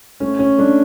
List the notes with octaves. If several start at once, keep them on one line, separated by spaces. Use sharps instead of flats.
A3 C#4
C#4
A3 D4